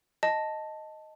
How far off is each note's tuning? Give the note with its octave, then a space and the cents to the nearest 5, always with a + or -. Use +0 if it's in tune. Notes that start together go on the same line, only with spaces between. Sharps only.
D#5 +0 A5 +0